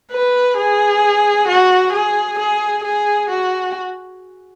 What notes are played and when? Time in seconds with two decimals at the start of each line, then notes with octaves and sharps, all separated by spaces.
0.12 B4
0.57 G#4
1.48 F#4
1.93 G#4
2.39 G#4
2.84 G#4
3.30 F#4